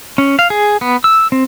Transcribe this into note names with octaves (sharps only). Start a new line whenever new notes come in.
C#4
F5
G#4
B3
E6
C4